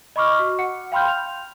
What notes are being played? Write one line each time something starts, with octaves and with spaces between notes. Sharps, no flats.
D#5 B5 C#6 D6 F6
F#4
F#5 C#7
F5 G5 B5 C6 F6 G6
F7